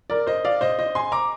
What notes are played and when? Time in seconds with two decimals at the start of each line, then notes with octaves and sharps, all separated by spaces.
0.10 A#4 D5
0.27 C5 D#5
0.45 D5 F5
0.61 C5 D#5
0.79 C5 D#5
0.95 G#5 C6
1.12 A#5 D6